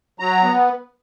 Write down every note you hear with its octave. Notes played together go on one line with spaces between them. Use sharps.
F#3 A#5
B3